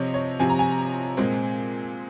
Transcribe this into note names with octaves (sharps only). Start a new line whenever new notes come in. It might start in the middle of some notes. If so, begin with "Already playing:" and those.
Already playing: C3 F3 C4 C#5 D#5
C#5
C3 F3 C4 G#5
A#5
G#5
A#2 G#3 C4